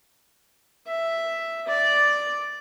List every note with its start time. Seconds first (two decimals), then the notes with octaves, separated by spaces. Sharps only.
0.87 E5
1.67 D5